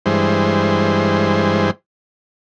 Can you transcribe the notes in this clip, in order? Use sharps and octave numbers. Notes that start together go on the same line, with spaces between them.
G2 E3 G#3 C5